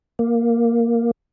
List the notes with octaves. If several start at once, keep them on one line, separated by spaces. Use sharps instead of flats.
A#3